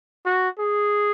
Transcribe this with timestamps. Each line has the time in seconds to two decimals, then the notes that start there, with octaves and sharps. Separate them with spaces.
0.26 F#4
0.59 G#4